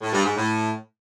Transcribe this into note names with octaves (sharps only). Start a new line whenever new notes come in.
A2
G2
G#2
A2